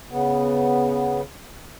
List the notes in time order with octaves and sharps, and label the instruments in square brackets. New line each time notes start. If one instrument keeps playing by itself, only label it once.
[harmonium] C#3 B3